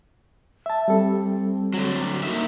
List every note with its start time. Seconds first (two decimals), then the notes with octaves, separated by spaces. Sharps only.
0.66 E5 A5
0.88 G3 C4 A4
1.74 D3 F#3
2.23 A#3 D#4 E5